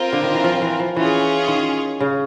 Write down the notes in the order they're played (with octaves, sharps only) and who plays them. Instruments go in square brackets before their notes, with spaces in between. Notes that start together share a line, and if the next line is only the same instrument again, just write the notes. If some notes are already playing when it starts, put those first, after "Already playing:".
Already playing: [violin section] C4 F4 A#4
[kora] D3
D#3
E3
F3
E3 F3
F3
[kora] E3 [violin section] C#4 F4 G#4
[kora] D#3
C#3